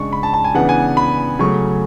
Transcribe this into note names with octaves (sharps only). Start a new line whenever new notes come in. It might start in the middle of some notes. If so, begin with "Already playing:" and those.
Already playing: C#3 G#3 D4 C#6
B5
A5
A5
G#5
C#3 E3 B3 D4 F#5
G#5
B5
C#3 F#3 A3 C#4 C#6